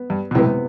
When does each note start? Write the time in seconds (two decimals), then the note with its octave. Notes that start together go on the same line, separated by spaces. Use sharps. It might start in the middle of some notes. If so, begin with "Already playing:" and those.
Already playing: B3
0.10 G2
0.31 B2
0.35 F#2 A2 C3 E3 B3